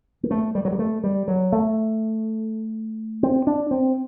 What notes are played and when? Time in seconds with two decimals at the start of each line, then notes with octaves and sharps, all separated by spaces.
0.23 A#3
0.31 A3
0.55 G3
0.65 F#3
0.72 G3
0.79 A3
1.04 G3
1.28 F#3
1.52 A3
3.23 C4
3.47 D4
3.71 C4